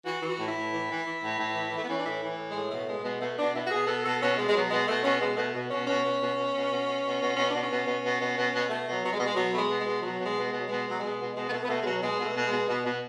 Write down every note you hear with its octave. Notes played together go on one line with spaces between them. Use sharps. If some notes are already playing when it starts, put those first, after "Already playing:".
E3 F#4
E3
F#4
A2
E4
A2
E3
E3
E3
A2
A2
E3
E3
A3
B3
E3 C#4
D4
A2 E4
E3
A2
G#3
A2
B2 A3
B2 G#3
B2 G#3
B2 A3
B2 D4
B2 E4
F#4
B2 G#4
B2 A4
B2 A4
B2 C#4
B2 G#3
G#3
B2 F#3
B2 G#3
B2 A3
B2 C#4
B2 G#3
B2 A3
B2
B2 C#4
B2 C#4
B2
B2
B2
B2
B2
B2
B2
B2
B2 C#4
B2 D4
C#4
B2
B2
B2
B2
B2
B2
B2 A3
B2 F#3
B2 F#3
G#3
B2
G#3
B2 F#3
B2 G#3 A3
B2
G#3
B2
B2 F#3
B2
G#3
B2
G#3
B2
F#3
B2 G#3
B2
F#3
B2 G#3
B2
B2 G#3
B3
B2 A3
B3
B2 A3
G#3
B2 F#3
B2 G#3
B2 A3
B2
G#3
B2
B2
B2